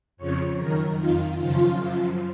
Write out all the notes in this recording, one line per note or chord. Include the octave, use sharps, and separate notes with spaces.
F2 C#3 F3 C#5
F#2 D#3 A#4
F2 D#3 F4
F#2 C#3 F3 F4
F#2 F3